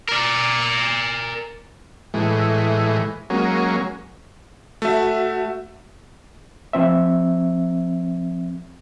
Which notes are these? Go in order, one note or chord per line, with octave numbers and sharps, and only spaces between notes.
A#4 D5
A2 E3 G#3
F#3 G#3 A#3 C#4
A3 F#4 E5 F#5
F3 C4 E5